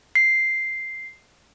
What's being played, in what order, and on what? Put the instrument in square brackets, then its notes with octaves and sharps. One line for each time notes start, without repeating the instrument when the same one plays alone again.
[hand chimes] C7